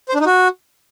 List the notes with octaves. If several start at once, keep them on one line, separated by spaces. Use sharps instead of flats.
C5
D4
D#4
F#4